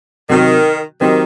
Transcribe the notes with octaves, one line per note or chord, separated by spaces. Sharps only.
C3 D#3 F#3 C4 F#4
D#3 F#3 C4 D#4 G4